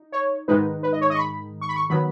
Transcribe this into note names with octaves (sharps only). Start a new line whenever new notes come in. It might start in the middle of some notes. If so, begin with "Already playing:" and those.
Already playing: D#4
C#5
G#2 D#3 G#3 D#4 B4
B4
D#5
C#5
D#5
C#6
B5
C#6
B5
C#6
D#3 F#3 B3 B5